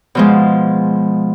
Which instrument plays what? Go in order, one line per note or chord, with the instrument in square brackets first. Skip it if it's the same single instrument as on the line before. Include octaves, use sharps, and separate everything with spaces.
[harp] B2 F3 G#3